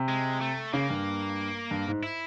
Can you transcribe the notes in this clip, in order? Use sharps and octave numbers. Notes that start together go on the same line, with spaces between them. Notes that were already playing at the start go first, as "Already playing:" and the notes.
Already playing: C3
G#3
A3
C#3 A#3
G2
G2
G#2
E4